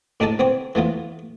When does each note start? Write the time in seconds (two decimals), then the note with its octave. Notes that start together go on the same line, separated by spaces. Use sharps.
0.20 A2 D4 D#4 G#4 A4 A5
0.39 B3 C4 C#5
0.75 E3 A3 B3 F4